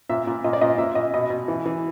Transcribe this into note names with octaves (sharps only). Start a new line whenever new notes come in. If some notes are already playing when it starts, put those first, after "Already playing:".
A#2 E5
A#2
A#2 D#5
D5
A#2 D#5
A#2 E5
A#2 D#5
B2 D#5
B2
E3
E3